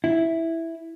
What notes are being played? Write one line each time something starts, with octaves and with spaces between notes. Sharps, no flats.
E4